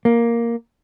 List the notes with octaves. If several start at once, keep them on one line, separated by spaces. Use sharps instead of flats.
A#3